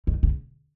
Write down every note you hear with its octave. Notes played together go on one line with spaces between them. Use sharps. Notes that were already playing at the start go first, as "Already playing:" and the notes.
D#3
C#3